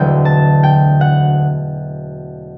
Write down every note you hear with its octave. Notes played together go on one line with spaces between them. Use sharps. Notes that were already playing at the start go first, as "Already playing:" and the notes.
Already playing: E1 D2 D3 F#3 G5
A5
G5
F#5